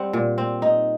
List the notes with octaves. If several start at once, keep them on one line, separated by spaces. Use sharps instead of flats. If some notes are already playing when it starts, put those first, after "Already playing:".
Already playing: G3 C4 F#5
A#2
C4
D#4